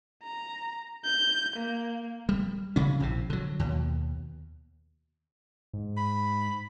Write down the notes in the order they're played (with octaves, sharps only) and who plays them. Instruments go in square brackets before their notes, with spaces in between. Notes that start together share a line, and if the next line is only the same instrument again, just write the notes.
[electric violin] A#5
G6
A#3
[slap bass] G3
C#3 C#4
A#1 A2 C3
D3 F#3
D#2 B2
[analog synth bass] G#2
[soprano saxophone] B5